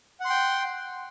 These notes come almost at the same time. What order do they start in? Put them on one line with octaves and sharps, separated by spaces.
F#5 C6 G5